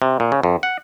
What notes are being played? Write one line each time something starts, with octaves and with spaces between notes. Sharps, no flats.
C3
A#2
C#3
F2
F#5